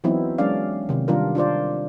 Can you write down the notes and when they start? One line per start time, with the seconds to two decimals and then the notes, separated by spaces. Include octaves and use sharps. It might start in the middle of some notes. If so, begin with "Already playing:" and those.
0.04 E3 F#3 B3 C4 D#4 E4
0.38 F#3 G#3 C#4 D4 D5 F5
0.89 C3 D#3
1.08 D#3 G3 D4 F4 A#4
1.35 D4 F4 C5 D5